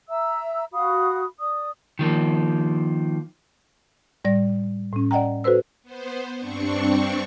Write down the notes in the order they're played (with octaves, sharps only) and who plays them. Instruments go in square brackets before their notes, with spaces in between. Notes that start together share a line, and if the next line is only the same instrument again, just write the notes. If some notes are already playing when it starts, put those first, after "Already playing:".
[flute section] E5 A#5 E6
F#4 F5 B5 D#6
D5 D#6
[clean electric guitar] D#3 F3 A#3
[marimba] A2 G3 D5 A#6
A2 C#4
D5 D#5 F#5 G5 A#5
F#4 A4 B4 C5 E6
[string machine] B3 C5
G2 C4 D4 C#6